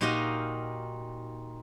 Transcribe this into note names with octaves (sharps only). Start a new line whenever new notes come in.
A#2 D#4 F#4 G4 D#5 F5